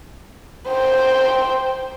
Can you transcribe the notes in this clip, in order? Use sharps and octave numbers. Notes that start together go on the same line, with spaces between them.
C5 G5